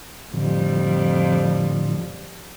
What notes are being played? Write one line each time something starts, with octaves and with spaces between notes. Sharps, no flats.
F2 A2 D3 F3 G3